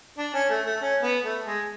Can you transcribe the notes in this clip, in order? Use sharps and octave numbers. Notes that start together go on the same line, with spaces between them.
D4
C#4
A3
A3
C#4
B3
A3
G#3